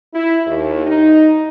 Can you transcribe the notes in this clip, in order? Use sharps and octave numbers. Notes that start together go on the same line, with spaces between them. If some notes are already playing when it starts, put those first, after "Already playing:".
E4
D#2
D#4